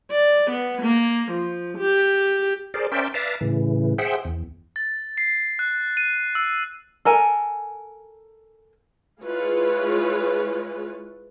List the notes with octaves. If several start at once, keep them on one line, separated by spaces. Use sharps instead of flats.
D5
B3
A#3
F3
G4
G#4 A#4 C5 D5
C#4 A#4 C5 D5 E5 G5
B4 D5 E5 F5 A5 A#5
A2 C#3 E3
G#4 C5 E5 F#5 G5
E2
A6
C7
F#6
D#7
E6
A4 A#4 G#5
G#3 E4 F4 G#4 B4 C#5